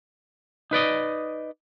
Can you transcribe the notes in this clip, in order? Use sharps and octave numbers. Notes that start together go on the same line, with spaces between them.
D#4 B4 D5 D#5